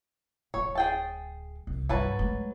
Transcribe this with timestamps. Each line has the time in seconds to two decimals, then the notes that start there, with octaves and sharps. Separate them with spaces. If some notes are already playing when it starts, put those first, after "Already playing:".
0.54 D1 C#5
0.75 G#4 G5 A5
1.67 C2
1.89 G2 F#3 B4 A5
2.19 G#3 A3